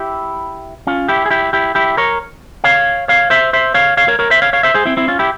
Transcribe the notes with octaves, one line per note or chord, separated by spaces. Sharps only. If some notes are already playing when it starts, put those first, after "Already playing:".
Already playing: E4 G4
C#4 F4
E4 G4
G#4
E4 G4
E4 G4
E4 G4
A#4 C#5
C#5 F5
C#5 F5
C5 E5
C5 E5
C#5 F5
C#5 F5
A#4 C#5
A#4 C#5
C5 E5
C#5 F5
C#5 F5
C5 E5
G#4 C5
C4 E4
C4 E4
C#4 F4
E4 G4